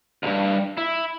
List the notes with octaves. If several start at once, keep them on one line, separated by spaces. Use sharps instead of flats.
C#2 G2
E4